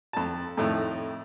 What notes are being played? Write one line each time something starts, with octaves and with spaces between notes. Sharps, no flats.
F2 A5
F2 A2 D#3